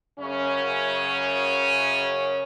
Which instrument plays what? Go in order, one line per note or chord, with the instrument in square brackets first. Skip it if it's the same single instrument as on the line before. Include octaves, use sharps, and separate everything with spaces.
[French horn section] F#2 C#3 C#4